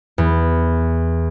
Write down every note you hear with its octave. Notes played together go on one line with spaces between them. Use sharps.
E2